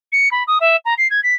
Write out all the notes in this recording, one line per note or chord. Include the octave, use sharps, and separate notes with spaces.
C#7
B5
D#6
E5
A#5
C7
G#6
B6